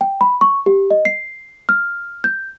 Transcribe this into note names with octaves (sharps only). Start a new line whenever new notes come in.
G5
B5
C#6
G4
D#5
C7
F6
G6